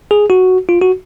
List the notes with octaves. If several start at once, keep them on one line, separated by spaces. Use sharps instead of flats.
G#4
F#4
F4
F#4